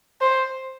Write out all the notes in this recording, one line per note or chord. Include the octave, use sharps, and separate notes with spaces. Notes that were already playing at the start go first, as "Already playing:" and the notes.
C5